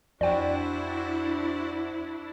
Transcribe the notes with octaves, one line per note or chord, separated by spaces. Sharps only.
F2 D4 E4 F#4 C5 D5 G5